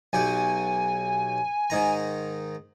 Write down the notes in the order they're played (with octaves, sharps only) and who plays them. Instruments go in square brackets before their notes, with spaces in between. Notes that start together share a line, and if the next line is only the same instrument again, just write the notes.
[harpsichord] B1 F#3 G4 [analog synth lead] G#5
[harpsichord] G#2 D#3 A#5